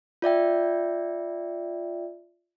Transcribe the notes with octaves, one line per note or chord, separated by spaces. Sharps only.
F4 D5 E5 G5